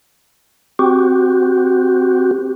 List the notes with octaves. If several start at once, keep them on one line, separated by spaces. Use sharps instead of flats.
C4 F#4 G4